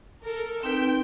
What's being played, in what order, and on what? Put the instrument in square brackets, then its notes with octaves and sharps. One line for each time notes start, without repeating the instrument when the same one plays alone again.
[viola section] A4 A#4
[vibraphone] C4 D#4 B4 [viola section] G5